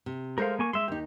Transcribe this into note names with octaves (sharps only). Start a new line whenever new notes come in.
C3
G#3 A3 A4 A#4 C5 F5
A#3 G#5 C#6
G#3 E5 C6
D#2 D#4 G4